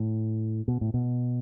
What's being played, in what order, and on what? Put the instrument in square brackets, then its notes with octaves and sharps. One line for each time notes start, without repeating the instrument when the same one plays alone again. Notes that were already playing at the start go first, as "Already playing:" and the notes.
Already playing: [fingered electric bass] A2
B2
A2
B2